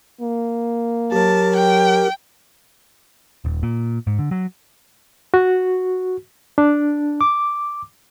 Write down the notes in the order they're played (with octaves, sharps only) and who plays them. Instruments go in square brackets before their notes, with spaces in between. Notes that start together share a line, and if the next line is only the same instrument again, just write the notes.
[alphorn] A#3
[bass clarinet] F#3 [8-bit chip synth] G4 A#4 [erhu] A5
[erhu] G5
[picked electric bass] D#1
A#2
G#2
D3
F#3
[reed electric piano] F#4
D4
D6